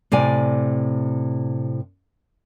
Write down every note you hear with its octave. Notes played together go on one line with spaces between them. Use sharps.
A2 C3 D5 G#5